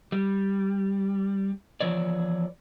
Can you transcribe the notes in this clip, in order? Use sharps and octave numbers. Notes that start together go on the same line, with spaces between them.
G3
E3 F3 C#5 D5